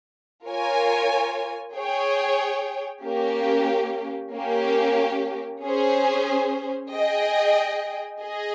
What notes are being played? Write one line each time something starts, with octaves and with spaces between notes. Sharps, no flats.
F4 A#4 C#5 G#5
G#4 C#5 G5
A#3 C#4 G4
A#3 C#4 G4
C#4 G#4 C5
G#4 D#5 G5
G#4 D#5